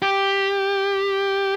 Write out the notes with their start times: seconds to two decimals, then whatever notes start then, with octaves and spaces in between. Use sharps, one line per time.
0.02 G4